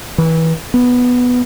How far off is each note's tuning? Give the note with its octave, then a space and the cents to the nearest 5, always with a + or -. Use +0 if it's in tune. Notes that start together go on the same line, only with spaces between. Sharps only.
E3 -25
B3 +0